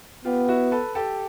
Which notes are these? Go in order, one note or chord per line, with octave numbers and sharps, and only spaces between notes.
B3 F4 G4
E4 F#4
A4 B4
G4 A4